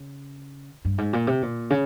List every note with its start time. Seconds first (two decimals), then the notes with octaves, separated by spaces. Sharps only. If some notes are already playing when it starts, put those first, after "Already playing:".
Already playing: C#3
0.85 G2
0.98 G#2
1.13 A#2
1.27 C3
1.42 A#2
1.70 C#3